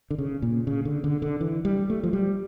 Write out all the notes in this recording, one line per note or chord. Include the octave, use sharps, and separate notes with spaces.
D3
C#3
A#2
C#3
D3
D3
D3
E3
G3
A3
F3
G3